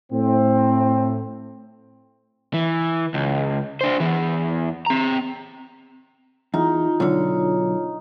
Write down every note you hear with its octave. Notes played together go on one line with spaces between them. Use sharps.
A2 C4
E3
C#2
D4 C5
E2 E3
C4 A#5
E2 D#4 F4
B1 D3 F4 C#5